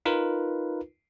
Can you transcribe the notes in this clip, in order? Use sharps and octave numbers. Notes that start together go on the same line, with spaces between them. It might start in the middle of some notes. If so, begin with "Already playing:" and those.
D#4 F4 A#4 B4